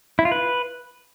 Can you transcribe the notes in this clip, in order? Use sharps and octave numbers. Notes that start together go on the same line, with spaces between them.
E4
F4
B4